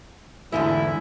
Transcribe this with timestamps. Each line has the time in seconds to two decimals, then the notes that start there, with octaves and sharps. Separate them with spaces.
0.52 E2 G#2 D3 E4